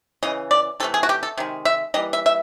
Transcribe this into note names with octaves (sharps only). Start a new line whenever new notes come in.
C#3 E3 D#5
D5
C3 E3 A3 A4
G#4
F#4
G4
A4
C3 D#3 G#3
E5
E3 G3 A#3 D#5
E5
E5